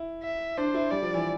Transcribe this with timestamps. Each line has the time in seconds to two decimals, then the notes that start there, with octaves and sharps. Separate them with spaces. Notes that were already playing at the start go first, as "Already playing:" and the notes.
Already playing: E4
0.23 E5
0.57 D4 C5
0.74 E4
0.91 G3 D5
1.02 F3
1.14 E3